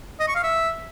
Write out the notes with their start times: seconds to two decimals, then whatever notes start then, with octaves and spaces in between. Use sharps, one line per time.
0.20 D#5
0.28 C#6
0.36 F5
0.43 E5